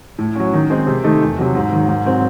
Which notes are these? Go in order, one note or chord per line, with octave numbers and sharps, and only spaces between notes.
A2
F#3 C#4
D#3
G#3 C4 D#4
C3
D#3 A3 D#4
E2
C3 F#3
G#2
D#3 F#3
G#2
F#3 C4